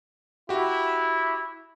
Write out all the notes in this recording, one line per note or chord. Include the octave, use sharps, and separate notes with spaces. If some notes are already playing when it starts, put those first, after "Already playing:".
E4 F#4 G4